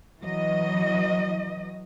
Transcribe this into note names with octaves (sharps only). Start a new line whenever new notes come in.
E3 F#3 D#5